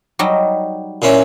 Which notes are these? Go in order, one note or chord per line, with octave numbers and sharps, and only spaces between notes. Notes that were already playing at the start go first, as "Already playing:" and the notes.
F#3 G3 D#4
A#2 C#4 E4